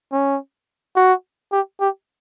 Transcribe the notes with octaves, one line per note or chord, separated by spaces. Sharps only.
C#4
F#4
G4
G4